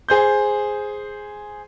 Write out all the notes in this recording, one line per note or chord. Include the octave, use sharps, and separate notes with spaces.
G#4 C5 G6